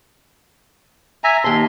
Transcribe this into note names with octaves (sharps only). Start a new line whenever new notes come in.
E5 G#5 A#5
D#2 A5 C6